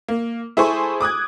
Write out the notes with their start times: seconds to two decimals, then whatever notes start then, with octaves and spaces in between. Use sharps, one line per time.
0.08 A#3
0.57 E4 G#4 A4 C5 G#5 C#6
1.01 D6 D#6 F#6 G#6